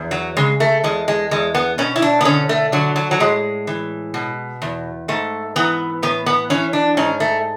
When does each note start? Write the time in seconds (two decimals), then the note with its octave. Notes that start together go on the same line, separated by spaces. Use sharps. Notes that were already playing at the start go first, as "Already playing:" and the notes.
Already playing: E2
0.11 F#3
0.37 C#3 G#3
0.60 A3
0.84 E2 G#3
1.08 G#3
1.31 E2 G#3
1.55 B3
1.78 B2 C#4
1.96 E4
2.02 D4
2.21 B3
2.25 D3 C#4
2.49 A3
2.72 D3 F#3
2.96 F#3
3.11 F#3
3.20 A2 G#3
3.67 E3
4.14 B2
4.62 E2
5.08 G#2 A3
5.56 E3 B3
6.03 A2 B3
6.26 B3
6.50 E3 C#4
6.73 D4
6.97 G#2 C#4
7.20 A3